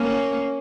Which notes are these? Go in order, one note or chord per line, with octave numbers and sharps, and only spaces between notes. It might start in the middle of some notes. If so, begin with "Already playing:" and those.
Already playing: A#3 C#4